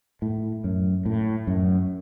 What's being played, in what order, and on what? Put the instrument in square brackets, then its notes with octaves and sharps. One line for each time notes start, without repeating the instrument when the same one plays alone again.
[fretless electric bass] A2
F#2
A2
F#2